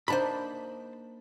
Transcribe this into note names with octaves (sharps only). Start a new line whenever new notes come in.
A#3 D4 D#4 C5 A5 B5